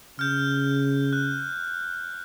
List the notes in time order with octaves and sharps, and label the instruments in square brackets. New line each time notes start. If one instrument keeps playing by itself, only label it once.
[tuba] C#3 [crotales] F6 G6
[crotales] F#6